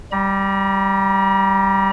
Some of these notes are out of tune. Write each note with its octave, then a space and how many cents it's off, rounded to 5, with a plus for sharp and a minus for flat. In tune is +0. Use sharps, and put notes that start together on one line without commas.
G3 +0 A#5 +40